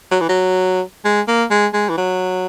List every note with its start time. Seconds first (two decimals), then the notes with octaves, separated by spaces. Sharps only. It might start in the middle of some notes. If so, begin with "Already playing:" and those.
0.11 F#3
0.21 E3
0.29 F#3
1.05 G#3
1.28 A#3
1.51 G#3
1.73 G#3
1.89 E3
1.97 F#3